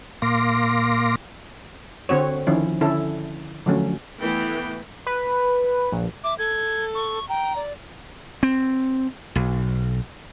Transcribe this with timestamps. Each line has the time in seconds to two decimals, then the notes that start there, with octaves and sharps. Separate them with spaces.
0.22 A#2 A#3 F5 C6 D6 A#6
2.09 D3 C4 F#4 C#5
2.47 D#3 F3 C#4 E4
2.81 D3 C#4 E4 A4
3.66 D3 F3 F#3 A3 C#4
4.20 E3 A3 B3 G5
5.07 B4
5.92 A#1
6.24 E5 D6
6.38 A4 G#6
6.95 C#6
7.29 G5 A#5
7.56 D5
8.43 C4
9.35 B1